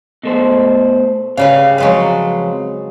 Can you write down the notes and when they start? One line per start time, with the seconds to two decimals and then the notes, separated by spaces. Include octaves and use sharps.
0.23 B2 A3 C5
1.37 C#3 G3 B4 F5
1.78 F2 F#3 G#3 B4 F5